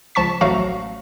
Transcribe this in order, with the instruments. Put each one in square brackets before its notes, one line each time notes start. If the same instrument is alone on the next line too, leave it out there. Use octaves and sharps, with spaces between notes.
[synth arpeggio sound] C#2 F3 A5 C#6 B6
A1 F#3 A3 F#4 F5 A#5